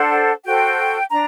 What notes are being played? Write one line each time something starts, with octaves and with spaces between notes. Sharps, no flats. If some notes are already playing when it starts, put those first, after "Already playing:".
Already playing: D4 A4 C5 F#5
F#4 A4 C5 G5
D4 A#5